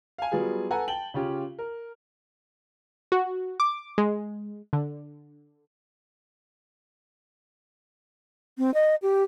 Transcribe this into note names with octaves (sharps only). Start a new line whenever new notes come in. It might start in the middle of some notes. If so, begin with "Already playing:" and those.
F5 G#5
F#3 G3 B3 F4 G#4
A4 B4 F#5 G#5 A#5
G5 A5 F#7 G7
C#3 C#4 F4 G4
A#4
F#4
D6
G#3
D3
C4
D#5
G4